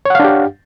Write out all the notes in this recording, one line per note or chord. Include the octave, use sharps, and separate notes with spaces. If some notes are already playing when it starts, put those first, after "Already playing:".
D4 G4 C#5 F5 F#5